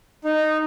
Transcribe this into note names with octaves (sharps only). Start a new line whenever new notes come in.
D#4